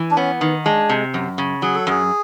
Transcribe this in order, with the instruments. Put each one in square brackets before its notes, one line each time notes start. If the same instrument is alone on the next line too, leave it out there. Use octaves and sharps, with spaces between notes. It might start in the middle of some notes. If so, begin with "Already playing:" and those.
Already playing: [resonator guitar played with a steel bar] E3
[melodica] D4
[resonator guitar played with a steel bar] B3 [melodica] C#4
[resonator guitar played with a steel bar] D#3
[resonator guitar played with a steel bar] G#3 [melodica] D4
[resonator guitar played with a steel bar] C3
F#2
C#3
[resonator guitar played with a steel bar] F#3 [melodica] G#4
[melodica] A4
[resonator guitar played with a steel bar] F#2 [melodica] G#4